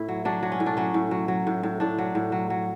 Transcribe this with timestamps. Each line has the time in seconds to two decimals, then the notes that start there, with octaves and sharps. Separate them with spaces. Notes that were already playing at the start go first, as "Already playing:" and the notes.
Already playing: A2 E4
0.08 F#3
0.25 F#3 D4
0.43 F#3
0.52 C#4
0.60 A2
0.66 D4
0.77 F#3 C#4
0.94 A2
1.11 F#3
1.28 F#3
1.47 A2
1.63 A2
1.80 A2 D4
1.98 F#3
2.15 A2
2.32 F#3
2.50 F#3